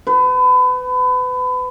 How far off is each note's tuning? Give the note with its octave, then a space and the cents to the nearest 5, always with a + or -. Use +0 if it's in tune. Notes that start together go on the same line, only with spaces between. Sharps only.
B4 +30